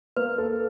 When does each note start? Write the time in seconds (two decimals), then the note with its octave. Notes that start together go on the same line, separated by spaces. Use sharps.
0.16 A#3 B4
0.38 A4